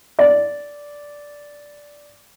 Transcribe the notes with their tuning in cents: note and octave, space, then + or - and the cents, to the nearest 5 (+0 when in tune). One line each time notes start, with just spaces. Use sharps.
D5 -10